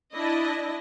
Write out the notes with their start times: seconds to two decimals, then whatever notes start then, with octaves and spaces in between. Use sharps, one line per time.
0.14 D4 E4 D#5 A5